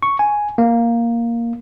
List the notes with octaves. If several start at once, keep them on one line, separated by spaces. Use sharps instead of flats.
C#6
G#5
A#3